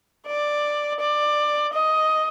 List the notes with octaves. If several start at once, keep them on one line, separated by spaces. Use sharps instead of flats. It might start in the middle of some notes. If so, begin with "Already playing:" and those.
D5
D5
D#5